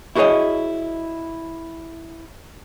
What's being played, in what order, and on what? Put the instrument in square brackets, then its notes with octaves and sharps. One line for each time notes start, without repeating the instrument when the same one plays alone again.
[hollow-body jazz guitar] E4 F#4 G#4 A#4 C#5 D#5